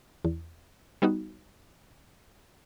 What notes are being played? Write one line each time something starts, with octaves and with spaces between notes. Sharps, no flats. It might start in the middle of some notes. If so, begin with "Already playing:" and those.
E2
G3 B3 D#4 F#4